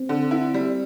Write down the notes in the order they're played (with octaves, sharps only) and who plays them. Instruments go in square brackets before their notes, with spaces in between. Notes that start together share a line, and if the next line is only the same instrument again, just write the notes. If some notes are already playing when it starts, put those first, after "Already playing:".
Already playing: [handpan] C4
[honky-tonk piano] D3
E4
G3